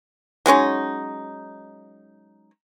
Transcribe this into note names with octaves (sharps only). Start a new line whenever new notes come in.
F#3 G#3 C#4 D#4